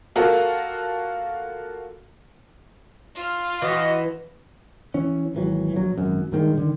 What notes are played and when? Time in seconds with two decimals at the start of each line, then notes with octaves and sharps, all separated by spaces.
0.16 A#3 F4 F#4 A4 A#4
3.15 F4 F6
3.62 E3 F#4 D#5
4.94 E3 C#4
5.34 G#1 E3 F#3
5.76 A#1 F#3
5.98 G#1 F#2
6.32 G2 A#2 D#3 G#3
6.56 D3 D#3